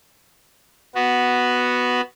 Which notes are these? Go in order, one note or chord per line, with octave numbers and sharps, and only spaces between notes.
B3 F#4